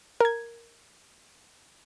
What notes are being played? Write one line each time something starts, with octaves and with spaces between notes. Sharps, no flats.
A#4 G#6